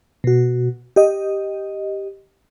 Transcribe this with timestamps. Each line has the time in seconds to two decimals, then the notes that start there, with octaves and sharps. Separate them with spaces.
0.24 B2 F#4
0.96 G4 D#5